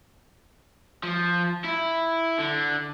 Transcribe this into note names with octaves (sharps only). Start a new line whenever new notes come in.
F3
E4
D3